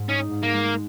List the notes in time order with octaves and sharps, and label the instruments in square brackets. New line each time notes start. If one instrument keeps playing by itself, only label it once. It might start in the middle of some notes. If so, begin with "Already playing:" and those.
Already playing: [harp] G#2 G#3
[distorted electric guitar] C#4 [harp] D#4
[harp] G#2
[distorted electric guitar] A#3
[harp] G#3